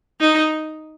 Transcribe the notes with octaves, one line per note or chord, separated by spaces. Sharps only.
D#4